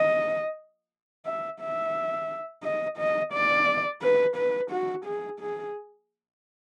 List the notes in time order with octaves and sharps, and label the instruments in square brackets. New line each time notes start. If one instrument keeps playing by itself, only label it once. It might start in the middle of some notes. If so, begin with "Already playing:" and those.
Already playing: [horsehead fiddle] D#5
E5
E5
D#5
D#5
D5
B4
B4
F#4
G#4
G#4